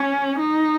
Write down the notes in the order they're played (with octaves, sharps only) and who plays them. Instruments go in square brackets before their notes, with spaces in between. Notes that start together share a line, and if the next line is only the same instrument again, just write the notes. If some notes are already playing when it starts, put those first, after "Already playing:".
Already playing: [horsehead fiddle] C#4
D#4